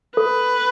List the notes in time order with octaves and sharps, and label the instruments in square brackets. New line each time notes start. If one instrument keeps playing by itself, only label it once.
[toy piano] A4 [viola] B4